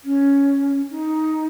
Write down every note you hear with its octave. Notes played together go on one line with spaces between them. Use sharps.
C#4
D#4